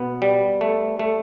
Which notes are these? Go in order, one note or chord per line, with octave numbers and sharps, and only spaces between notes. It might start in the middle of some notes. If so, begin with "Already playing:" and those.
Already playing: B2 B3
G3
A3
A3